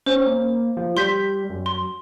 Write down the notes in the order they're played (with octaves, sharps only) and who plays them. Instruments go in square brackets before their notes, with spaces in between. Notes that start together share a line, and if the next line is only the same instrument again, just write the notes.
[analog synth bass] C#4 [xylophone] C5
[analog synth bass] A#3
F3
[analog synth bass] G3 [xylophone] C6 G6 B6
[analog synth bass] F#2
[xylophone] C6